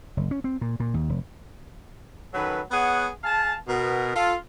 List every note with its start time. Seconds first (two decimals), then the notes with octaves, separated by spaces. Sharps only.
0.17 F#1
0.31 C#4
0.44 C4
0.61 A#2
0.80 A#2
0.94 D#2
1.09 F1
2.33 D#3 F#3 C#4 A4 B4
2.71 B3 G#4 C#5 F#5
3.23 G#4 F5 G#5 A5
3.67 B2 B3 A#4
4.15 F4 A4